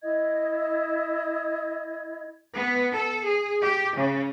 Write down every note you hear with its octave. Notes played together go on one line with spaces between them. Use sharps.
E4 D#5 G#6
B3
A4
G#4
G4
C#3